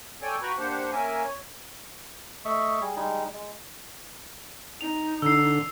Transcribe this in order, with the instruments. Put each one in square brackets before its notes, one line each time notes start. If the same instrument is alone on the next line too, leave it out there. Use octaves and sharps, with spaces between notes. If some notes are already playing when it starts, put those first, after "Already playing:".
[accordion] A4 C#5 D5 G5 G#5
F#4 B4 G5 A#5 B5 C#6
A#3 D4 G4 C5 F#5
A#3 C#4 A#4 E5 G#5
C#5
[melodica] A3 D#5 E5 C#6
G3 G#4
G3 G#3 D#4
G#3
[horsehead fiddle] D#4 [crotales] F7
[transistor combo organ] D3 [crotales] E6 C7